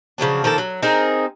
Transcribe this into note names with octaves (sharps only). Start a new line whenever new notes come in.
C#3 F3 F#3 D4
D#3 F3 A#3 A4
F#3
C4 D#4 G#4 A#4